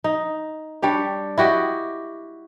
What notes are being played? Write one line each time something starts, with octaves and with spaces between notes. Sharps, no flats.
D#4
G3 D4 G4 C#5
E4 F#4 G4 D#5